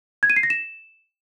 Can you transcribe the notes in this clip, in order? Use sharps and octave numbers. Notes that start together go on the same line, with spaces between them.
G#6
D#7
C7
A#6
E7